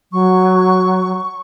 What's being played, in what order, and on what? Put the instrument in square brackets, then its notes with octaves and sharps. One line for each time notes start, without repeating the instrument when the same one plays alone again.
[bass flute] F#3 [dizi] C#6